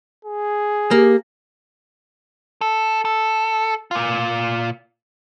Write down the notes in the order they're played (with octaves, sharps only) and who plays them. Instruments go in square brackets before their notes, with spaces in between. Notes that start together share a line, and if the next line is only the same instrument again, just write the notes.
[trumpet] G#4
[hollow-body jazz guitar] A#3 [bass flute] G4
[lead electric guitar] A4
A4
A#2 F4